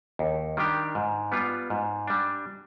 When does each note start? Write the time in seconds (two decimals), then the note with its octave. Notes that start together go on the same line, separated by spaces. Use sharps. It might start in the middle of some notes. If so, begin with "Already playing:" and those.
0.19 D#2
0.57 D#3 G3 D4 G4
0.95 G#2
1.32 G3 B3 F4
1.70 G#2
2.08 G3 D4